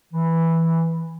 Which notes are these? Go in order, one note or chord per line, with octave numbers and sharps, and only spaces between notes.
E3